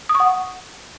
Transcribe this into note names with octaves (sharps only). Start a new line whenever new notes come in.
D#6
C#6
F#5